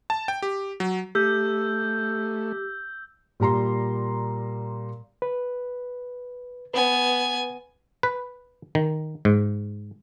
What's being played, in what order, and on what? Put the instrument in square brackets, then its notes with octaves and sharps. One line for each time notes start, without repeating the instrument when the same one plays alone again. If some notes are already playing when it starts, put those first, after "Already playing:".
[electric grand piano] A5
G5
G4
F#3
[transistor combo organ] A3 [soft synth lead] G4 [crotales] E6 G6
[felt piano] A#2 G3 A#5 C6
[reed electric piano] B4
[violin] B3 G#5 [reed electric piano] B4
[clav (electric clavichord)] B4
D#3
G#2